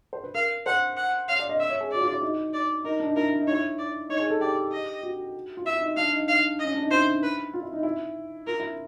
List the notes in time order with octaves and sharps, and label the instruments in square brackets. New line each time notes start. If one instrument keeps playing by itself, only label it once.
[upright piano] C5
B4
[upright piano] A#4 [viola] F5
[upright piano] C5 [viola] F#5
[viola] F#5
[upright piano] C#5 [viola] F5
[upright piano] D5
D#5
[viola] E5
[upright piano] C#5
G#4
[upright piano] F#4 [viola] D5
[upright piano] F4
E4
D#4
[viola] D5
[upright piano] D#4 [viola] A#4
[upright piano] D4
D#4
[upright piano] E4 [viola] A#4
[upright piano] E4
D#4
[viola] C#5
[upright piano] E4
[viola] D5
[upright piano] D#4 [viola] C#5
[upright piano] G#4
A4
[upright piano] G4 [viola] D5
[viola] D#5
[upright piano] F#4
F4
[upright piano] E4 [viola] E5
[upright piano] D#4
[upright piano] D4 [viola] F5
[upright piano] D#4
[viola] F5
D#5
[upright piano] C#4
D4
D#4
[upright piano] E4 [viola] C5
[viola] B4
[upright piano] F4
E4
D#4
E4
[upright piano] F4 [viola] A#4
[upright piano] E4